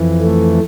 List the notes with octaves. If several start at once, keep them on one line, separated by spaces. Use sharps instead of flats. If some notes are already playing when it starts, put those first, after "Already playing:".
Already playing: F2 E3
A3